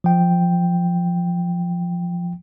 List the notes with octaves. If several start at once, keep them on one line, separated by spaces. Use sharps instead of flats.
F3 G5